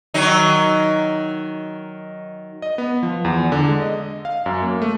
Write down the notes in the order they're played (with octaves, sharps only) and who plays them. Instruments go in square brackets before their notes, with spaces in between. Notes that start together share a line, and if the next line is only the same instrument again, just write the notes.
[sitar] D#3 F#3 D#4
[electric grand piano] D#5
B3
F3
E2
D3
G#3
D#5
F5
F#2
A#3
A3